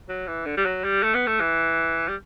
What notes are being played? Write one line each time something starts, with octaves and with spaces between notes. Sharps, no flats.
F#3
E3
D3
G3
F#3
G3
A3
B3
A3
E3
G3